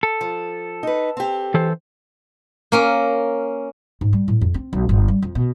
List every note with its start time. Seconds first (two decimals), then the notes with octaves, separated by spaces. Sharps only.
0.03 A4
0.21 F3
0.83 D#4 B4
1.17 C4 G4
1.54 E3 A4 C5
2.72 A#3 C#4 A#4
4.01 G#2
4.13 G3
4.28 A2
4.41 F2
4.54 C4
4.73 B1
4.89 G1
5.08 G3
5.22 F2
5.35 B2